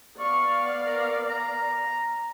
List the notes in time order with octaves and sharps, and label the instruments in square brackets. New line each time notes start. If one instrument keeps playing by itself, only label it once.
[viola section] B3 D5 F5 [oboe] C#6
[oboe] A#4
A#5